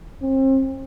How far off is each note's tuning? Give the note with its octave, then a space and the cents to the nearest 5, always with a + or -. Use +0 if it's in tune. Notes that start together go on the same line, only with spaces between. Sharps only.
C4 +35